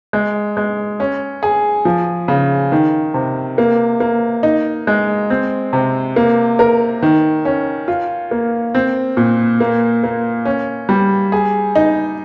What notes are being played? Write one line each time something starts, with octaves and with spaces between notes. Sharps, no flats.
G#3
G#3
C#4
G#4
F3
C#3
D#3
C3
A#3
A#3
D#4
G#3
C4
C3
A#3
A#4
D#3
C#4
F4
A#3
C4
A#2
A#3
A#3
C#4
G3
G#4
D#4